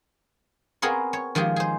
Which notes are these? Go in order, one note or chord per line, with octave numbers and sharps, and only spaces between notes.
B3 C4 G#4 A#4 C#5
C#5
D#3 F3 G#3 G4 G#4
G#4 C5